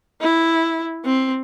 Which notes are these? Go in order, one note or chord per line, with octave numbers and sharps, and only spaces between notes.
E4
C4